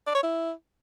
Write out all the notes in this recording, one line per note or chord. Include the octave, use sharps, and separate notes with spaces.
D5
C#5
E4